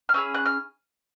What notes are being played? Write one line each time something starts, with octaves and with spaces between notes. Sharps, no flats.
F6
C#4 E4 G#4 E6
F#6
F6